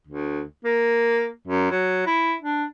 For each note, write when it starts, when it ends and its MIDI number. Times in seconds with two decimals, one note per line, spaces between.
0.07 0.42 38
0.64 1.28 58
1.48 1.67 42
1.71 2.03 54
2.06 2.34 64
2.41 2.64 62